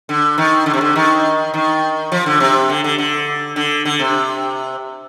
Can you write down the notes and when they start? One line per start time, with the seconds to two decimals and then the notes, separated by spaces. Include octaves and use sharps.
0.09 D3
0.38 D#3
0.66 D3
0.74 C3
0.81 D3
0.96 D#3
1.54 D#3
2.12 F3
2.26 D3
2.40 C3
2.70 D3
2.84 D3
2.98 D3
3.56 D3
3.85 D3
3.99 C3